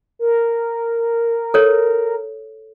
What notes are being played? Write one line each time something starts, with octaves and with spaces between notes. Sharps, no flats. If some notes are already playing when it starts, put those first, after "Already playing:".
A#4
A4 C#5